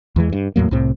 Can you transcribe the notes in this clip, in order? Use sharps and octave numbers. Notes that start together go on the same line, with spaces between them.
E2 E3 G#3
G2
E2 A2 F#3 A#3
C2 A2 C3 C4